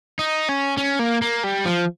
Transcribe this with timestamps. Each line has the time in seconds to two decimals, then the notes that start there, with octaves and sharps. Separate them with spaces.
0.19 D#4
0.49 C#4
0.77 C#4
0.99 A#3
1.22 A#3
1.44 G3
1.65 F3